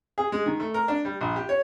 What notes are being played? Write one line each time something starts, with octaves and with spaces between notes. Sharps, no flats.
G#4
G#3
D#3
A3
A#4
D4
G3
A#1
G4
C#5